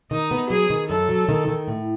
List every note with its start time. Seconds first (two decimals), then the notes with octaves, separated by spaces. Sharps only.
0.11 D#3 D#4
0.31 B3
0.50 F#3 G#4
0.70 D#3
0.89 F#2 A4
1.09 F#3
1.29 D#3
1.48 D#3
1.68 A2